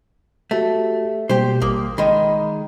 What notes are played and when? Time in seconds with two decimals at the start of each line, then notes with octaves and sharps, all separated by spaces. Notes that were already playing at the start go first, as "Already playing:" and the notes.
0.51 A3 F#4 G4
1.29 B2 G3 A#3 G4 C5
1.62 A1 A#3 D6 D#6
1.98 D#3 G#3 B5